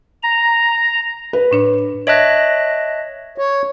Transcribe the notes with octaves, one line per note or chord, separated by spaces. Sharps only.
A#5
B4
A2 D4 C#5
C#5 D#5 E5 A5 F#6 A#6
C#5